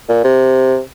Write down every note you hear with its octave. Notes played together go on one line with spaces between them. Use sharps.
A#2
C3